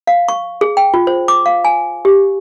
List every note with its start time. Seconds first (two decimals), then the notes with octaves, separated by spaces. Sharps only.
0.07 F5
0.28 C#6
0.61 G#4
0.77 G5
0.94 F4
1.07 C5
1.28 D6
1.46 F5
1.65 G#5
2.05 G4